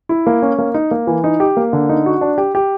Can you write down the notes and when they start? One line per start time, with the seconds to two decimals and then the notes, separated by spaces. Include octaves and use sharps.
0.09 E4
0.27 A#3
0.42 C#4
0.58 A#3
0.74 D#4
0.91 A#3
1.07 E3
1.24 D#4
1.40 G4
1.57 A#3
1.73 D3
1.89 D#4
2.06 F#4
2.21 D4
2.38 G4
2.55 G4